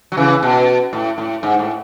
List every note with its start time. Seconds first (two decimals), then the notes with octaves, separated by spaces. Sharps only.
0.12 F#3
0.17 C#3 E3
0.43 B2
0.93 A2
1.18 A2
1.43 G#2
1.59 A2